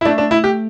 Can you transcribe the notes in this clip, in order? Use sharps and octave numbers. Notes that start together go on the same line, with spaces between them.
E4
A3 D4
D4
E4
G4